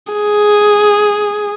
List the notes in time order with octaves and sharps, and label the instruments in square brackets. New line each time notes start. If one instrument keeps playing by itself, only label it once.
[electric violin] G#4